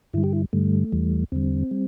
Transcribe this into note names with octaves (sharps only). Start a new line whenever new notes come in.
G2 D3 G3 E4
G4
E4
G2 D3 G3 A3
E2 E3 G3
E2 D3 G3 C4
G3